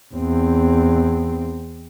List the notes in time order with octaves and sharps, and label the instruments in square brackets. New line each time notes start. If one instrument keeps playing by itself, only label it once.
[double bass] E2 C4